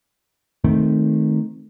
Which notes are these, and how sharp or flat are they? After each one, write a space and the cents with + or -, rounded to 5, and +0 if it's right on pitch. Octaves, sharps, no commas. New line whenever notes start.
D#3 +0 A3 -15 C4 +0